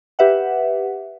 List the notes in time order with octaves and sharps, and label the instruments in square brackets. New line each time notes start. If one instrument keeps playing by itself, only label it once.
[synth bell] G4 B4 E5 F#5